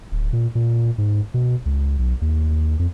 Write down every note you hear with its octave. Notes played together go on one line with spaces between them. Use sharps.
D1
A#2
A#2
G#2
B2
C#2
B1
D#2
F2